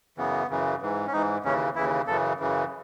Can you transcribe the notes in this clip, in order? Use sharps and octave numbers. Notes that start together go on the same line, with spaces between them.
F#2 C#3 E3 B3
F#2 C#3 E3
G#2 E3
C#4
G#2 E3 D#4
D#2 C#3 E3 C#4
D#2 C#3 E3 E4
F#2 C#3 E3 A4
F#2 C#3 E3